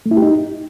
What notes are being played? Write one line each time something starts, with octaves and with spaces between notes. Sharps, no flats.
A3
E4
G4
D#4